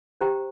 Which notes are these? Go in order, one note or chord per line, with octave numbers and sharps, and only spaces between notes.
G4 C5 G5 A#5